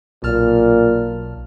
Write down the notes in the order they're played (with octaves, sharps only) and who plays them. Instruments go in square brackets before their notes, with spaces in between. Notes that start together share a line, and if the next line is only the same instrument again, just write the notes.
[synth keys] B1 A5 F6 [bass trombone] A#2